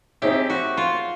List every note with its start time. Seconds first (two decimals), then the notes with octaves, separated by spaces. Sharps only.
0.22 C4 D#4 G4 G#4 C#5 E5
0.50 F#4
0.77 F4